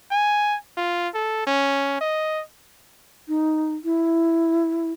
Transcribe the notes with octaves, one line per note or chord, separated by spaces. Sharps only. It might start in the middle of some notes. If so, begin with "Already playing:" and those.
G#5
F4
A4
C#4
D#5
D#4
E4